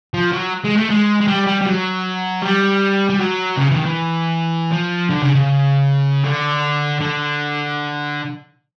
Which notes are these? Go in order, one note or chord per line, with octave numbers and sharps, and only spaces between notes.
F3
F#3
G#3
A3
G#3
G#3
G3
G3
G3
F#3
G3
G3
F#3
C#3
E3
D#3
E3
F3
D3
C#3
C#3
D3
D3